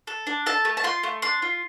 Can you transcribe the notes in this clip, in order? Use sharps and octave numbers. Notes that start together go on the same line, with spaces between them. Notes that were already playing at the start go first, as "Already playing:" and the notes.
A4
D4
A4 A5
A3
A5
F4 C6
A3
D4 C6
F4